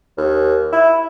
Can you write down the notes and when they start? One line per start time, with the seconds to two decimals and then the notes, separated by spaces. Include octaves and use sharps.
0.17 D#2
0.72 E4